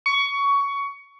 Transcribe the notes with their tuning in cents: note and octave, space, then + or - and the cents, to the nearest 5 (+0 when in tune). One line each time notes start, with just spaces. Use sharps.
C#6 +20